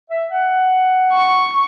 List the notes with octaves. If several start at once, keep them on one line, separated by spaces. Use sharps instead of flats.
E5
F#5
C#6